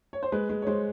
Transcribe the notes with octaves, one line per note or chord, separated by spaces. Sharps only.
C#5
C5
G#3 B4
G#3
C#5
G#3 C5